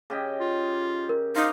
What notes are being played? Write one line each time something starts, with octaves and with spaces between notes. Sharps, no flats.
C#3 G4 D#5
F4
A#4
D#4 C5 F5 D6